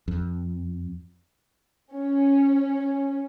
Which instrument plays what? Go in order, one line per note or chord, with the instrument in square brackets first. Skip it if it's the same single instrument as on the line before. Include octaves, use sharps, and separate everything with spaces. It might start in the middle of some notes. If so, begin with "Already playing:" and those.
[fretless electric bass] F2
[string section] C#4